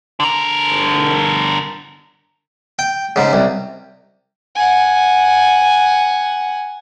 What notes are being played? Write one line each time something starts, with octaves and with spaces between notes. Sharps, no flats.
D3 A#4
G5
G#2 C#3
C2
F#5 G#5